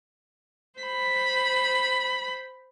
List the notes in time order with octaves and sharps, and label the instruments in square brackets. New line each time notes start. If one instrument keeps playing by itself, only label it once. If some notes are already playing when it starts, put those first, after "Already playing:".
[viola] C5 B5